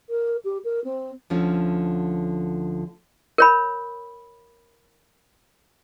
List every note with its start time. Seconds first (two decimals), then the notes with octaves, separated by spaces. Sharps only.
0.09 A#4
0.44 G4
0.64 A#4
0.84 C4
1.30 D2 D3 F3 C#4
3.38 A#4 C#5 B5